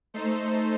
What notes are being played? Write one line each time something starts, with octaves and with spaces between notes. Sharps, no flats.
A3 D#4 A4 C5